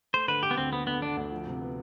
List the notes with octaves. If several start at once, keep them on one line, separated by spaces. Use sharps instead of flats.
A3 C5
D3 B4
D3 G4
B3
D2 C4
A3 B3
D3 B3
D3 D4
D2
F3
C3
B3